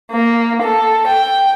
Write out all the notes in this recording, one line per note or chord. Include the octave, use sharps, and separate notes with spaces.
A#3
A4
G5